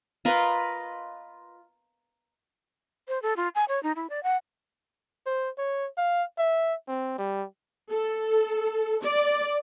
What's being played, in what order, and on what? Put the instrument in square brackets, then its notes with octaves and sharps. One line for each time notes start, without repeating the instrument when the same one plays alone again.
[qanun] F4 A#4 B4 D#5
[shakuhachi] C5
A4
F4
G#5
C#5
D#4
E4
D5
F#5
[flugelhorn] C5
C#5
F5
E5
C4
G3
[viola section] A4
D5